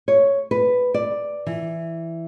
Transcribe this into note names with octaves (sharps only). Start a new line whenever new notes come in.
C#5
B4
D5
E3